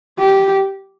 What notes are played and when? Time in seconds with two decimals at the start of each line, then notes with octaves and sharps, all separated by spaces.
0.18 G4